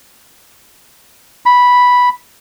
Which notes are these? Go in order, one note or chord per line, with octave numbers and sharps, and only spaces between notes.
B5